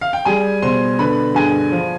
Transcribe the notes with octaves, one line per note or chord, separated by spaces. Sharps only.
F5
G5
G3 G#4 G#5
B2 C5 C6
D3 B4 B5
G2 G#4 G#5
F3